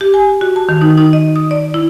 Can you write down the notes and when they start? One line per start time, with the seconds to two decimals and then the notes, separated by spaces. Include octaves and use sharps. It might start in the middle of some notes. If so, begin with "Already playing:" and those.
0.01 G4
0.14 G#5
0.41 F#4
0.56 A5
0.69 D#3
0.81 D#4
0.98 D#4
1.13 D#5
1.36 D#6
1.51 D5
1.74 E4